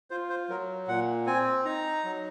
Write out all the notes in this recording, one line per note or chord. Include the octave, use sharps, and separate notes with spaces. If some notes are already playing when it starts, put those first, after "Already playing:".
F4 C5
C5
F#3 A#4
A#2 F#5
C4 G#5
D#4 A#5
F#3